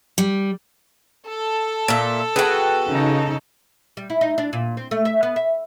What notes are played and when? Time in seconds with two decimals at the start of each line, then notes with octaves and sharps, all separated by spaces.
0.18 G3
1.29 A4
1.88 A#2 E5
2.36 B3 F#4 G#4 G5
2.89 C#3 D#4
3.97 G3
4.10 E4
4.21 D#4
4.38 D4
4.53 A#2
4.77 C4
4.91 A3
5.05 E5
5.23 B3
5.36 E5